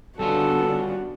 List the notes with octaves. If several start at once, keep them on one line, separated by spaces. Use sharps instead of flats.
D3 G3 B3 C#4 D4 F4 F#4 A4